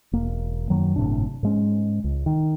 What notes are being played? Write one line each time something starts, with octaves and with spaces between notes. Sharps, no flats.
E1 A#3
F#2 D#3 F#3
G1 A2 C3 D4
G#2 G#3 C#4
C#2
D#3